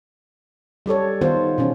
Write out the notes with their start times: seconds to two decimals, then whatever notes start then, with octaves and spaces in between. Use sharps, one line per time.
0.86 G3 G4 A4 C#5
1.21 D#3 B3 F4 C5
1.58 B2 E3 C#4